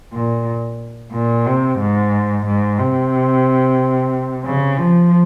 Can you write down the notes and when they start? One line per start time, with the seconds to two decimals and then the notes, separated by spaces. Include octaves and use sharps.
0.13 A#2
1.12 A#2
1.46 C3
1.79 G#2
2.46 G#2
2.79 C3
4.45 C#3
4.78 F3